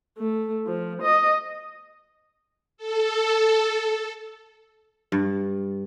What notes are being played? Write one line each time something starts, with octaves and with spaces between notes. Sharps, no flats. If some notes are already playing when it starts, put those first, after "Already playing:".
A3
F3
D#5
A4
G2